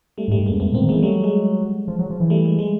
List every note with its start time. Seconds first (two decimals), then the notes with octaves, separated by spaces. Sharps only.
0.18 G3 A3
0.28 G#2
0.31 G3 A3
0.39 G2
0.46 F#2 G#3 A#3
0.60 F2 A3 B3
0.72 A#2
0.75 A#3 C4
0.82 D#3
0.89 E3 G#3 A#3
1.02 F#3 G3 A3
1.24 G#3
1.88 F3
1.99 F#3
2.10 F3
2.20 E3
2.30 G3 A3
2.46 G#3
2.59 G#3